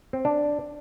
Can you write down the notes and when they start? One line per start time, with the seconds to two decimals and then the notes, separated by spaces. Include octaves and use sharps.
0.13 C4
0.25 D4